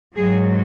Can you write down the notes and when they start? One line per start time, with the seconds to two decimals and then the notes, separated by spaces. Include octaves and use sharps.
0.15 G#2 F#3 G#4